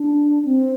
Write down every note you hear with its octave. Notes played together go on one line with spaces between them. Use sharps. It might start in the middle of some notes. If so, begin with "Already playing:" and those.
Already playing: D4
C4